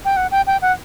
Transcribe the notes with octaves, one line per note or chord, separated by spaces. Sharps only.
G5
F#5
G5
G5
F#5